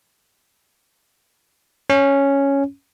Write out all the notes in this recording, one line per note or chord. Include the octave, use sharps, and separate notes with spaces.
C#4